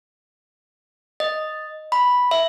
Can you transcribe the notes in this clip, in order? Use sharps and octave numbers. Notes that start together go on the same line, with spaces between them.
D#5
B5
E5